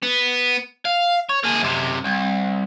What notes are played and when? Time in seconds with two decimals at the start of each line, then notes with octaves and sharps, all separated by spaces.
0.02 B3
0.85 F5
1.29 C#5
1.44 A#3 G#4
1.62 F#2 C3
2.05 C2